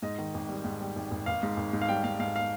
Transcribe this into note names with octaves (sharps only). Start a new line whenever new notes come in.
G#2 D#5
D#3
G#1
G3
G#2
G3
G#1
G#1
G#1 F5
G#2
G#1
G#2
F5
G3 G5
G#2 F5
G#2 F5
F5